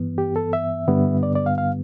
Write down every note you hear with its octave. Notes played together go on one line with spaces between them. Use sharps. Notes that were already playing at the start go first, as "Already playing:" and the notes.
Already playing: G2 E3 B3
G4
A4
E5
G2 D3 G3 B3
D5
D5
F5
F5